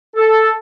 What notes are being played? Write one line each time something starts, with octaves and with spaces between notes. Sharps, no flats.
A4